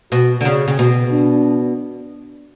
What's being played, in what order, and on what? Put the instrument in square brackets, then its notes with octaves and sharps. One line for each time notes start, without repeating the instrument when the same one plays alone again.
[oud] B2 [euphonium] F#4
[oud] D3
C#3
C#3
[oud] B2 [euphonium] F#4
[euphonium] D4